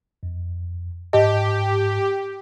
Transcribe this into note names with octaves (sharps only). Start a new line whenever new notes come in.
F2
G#2 G4 D#5 A5